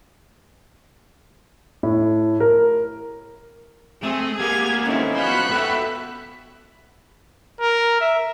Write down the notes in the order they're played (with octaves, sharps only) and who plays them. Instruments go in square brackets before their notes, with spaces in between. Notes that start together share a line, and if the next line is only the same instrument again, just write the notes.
[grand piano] A2
A#4
[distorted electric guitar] A3 [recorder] C4 [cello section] G#4
[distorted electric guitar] A#3 B3 [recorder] G4 [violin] G#6 F7
[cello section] D#3 C4 E4 [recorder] C#4 [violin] D#4 A4
[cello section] B3 F#4 [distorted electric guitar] C5 F5 [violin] B5 F#6
[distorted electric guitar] F#4 G5 [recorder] A4 [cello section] E5
[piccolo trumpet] A#4
E5